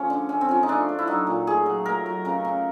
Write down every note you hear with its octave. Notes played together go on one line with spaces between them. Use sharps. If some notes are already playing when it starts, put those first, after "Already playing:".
Already playing: F3 A3 C#4
D3
A3 C#4
C4
F3 C#4
D#4
A3 D4
A3
E4
F#3 D#4
A#2
A3 G#4
F#3
A3 A#4
F#3
C#3 A#4
C#3